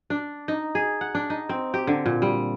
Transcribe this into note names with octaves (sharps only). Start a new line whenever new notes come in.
D4
D#4
G#4
F#5
D4
D#4
C4
G4
D3
A#2
G3